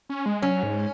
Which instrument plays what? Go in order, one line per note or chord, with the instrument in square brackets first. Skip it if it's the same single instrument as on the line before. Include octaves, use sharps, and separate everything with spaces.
[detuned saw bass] C#4
G#3
[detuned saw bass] F#3 [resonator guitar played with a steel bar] C#4
[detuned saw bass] G#2